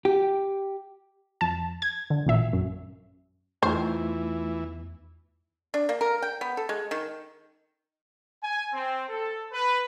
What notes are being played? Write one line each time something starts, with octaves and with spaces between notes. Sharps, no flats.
G4
F2 A5
G#6
D3
A1 A#2 E5
F#2
E2 E3 A3 D#4 F4 C5
D4
A#3
A#4
G5
B3
A4
G#3
D#3
G#5
C4
A4
B4